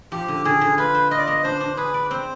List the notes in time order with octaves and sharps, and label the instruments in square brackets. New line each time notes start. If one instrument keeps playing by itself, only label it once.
[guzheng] F3 [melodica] G4
[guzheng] D3
[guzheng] D3 [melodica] G#4
[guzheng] D3
[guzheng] F4 [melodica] B4
[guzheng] C5
[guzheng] F4 [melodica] D#5
[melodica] D5
[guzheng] B3 [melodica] D#5
[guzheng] D4 [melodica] C5
[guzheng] D4
[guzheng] G#4 [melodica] B4
[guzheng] D5
[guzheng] C4 [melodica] C5